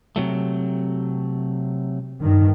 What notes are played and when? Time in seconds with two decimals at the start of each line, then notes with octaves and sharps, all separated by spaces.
0.16 C3 F#3 A3
2.20 G2 D#3